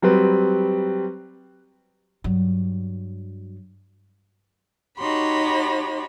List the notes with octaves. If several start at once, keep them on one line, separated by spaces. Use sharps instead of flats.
F#3 G3 C4 B4
G2 F#3
D#4 F#4 G4 C#5 B5 C6